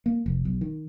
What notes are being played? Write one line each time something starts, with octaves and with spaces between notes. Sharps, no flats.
A#3
F1
B1
D#3